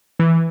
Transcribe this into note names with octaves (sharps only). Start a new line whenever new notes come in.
E3